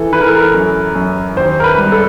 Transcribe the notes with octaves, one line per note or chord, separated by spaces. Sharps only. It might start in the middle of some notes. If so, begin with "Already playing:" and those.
Already playing: E3 A4
E3 B4
A#4
A4
A#4
F#2
F#2
D#2 C5
A#4
B4
G3
A4